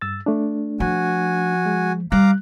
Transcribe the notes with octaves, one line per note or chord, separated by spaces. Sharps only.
G2 E6 A6
A3 D4
F3 F#4 G#5
G#3
G3 F5 A#5 D6 F#6